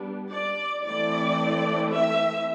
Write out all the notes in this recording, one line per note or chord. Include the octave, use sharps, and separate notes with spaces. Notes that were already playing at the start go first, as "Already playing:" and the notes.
Already playing: G3 B3 D4
D5
E3 A3 C4 D5
E5